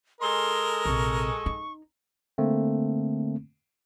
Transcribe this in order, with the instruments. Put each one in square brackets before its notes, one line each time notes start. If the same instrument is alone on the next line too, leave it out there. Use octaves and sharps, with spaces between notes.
[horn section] G#3 A4 D#5 [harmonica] A#4 [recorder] C6
[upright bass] A#1 C3 [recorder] C#6
[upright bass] D#4
[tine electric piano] D3 A3 A#3 C4